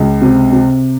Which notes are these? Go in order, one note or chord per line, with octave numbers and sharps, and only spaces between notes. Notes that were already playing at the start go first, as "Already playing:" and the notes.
Already playing: C#2
C3
C3